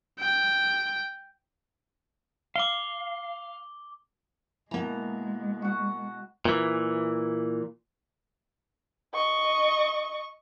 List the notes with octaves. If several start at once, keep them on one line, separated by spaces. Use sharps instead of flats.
G5
F5 D6 G7
B2 E3 G#3 A#3 A#5
F#4 F#5
A#2 E3
D#5 C#6